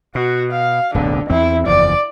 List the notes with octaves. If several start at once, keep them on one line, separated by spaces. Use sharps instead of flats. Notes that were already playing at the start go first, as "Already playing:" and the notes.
B2 F#4
F5
D1 B1 F#2 D3
E2 C4 E4
F#1 E2 F3 D5